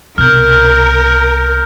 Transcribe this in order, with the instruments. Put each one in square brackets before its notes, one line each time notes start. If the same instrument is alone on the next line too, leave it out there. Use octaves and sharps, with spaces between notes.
[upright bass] C2 B2 [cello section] A#4 [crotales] F6 G6